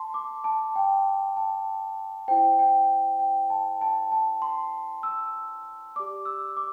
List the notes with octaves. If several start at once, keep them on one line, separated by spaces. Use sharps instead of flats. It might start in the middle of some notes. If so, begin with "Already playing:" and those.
Already playing: A5 C6
D6
A5
G5
A5
E4 C5 G5
G5
G5
A5
A5
A5
C6
E6
G4 D5 D6
E6
D6